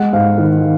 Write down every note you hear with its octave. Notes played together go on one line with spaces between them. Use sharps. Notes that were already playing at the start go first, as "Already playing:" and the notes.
Already playing: G#3 F#5
G#2 F5
D#3